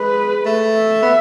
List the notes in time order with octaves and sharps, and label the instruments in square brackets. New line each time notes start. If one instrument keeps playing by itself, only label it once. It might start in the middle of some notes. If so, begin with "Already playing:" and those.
Already playing: [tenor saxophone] G#3 [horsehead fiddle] B4
[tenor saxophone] A3
[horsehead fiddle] E5
[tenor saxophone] B3